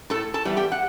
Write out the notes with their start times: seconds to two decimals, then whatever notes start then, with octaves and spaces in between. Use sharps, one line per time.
0.10 A2 A4 A5
0.34 A4 A5
0.45 E3 G3 B3
0.57 G4 G5
0.72 F#5